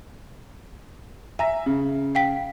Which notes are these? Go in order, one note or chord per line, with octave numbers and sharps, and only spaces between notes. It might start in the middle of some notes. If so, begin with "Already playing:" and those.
E5 G#5 A#5 A#6
C#3
F5 G5 B6